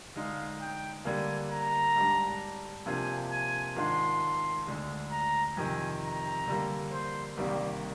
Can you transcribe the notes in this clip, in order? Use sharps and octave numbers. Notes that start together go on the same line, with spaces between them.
D3 G#3 D#4 F5
G5
D3 G3 A#3 G#5
A#5
G#2 G3 D4
C3 F3 A#3 D4 F4 G#5
G#5
G#2 D#3 G#3 D4 F4 C6
D2 D3 G#3
A#5
F2 C3 D#3 G#5
A#5
D3 G3 A#3
C5
C2 C3 D#3 G3 A#3 D5